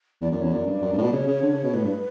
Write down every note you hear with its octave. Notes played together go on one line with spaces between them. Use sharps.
E2 D5
F#2 D5
E2 C#5
F#2 D5
G2
F#2
G2
A2
B2
C#3 C#5
C#3
D3
C#3
B2
A2 B4
G2